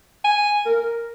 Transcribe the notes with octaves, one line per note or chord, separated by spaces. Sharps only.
G#5
A#4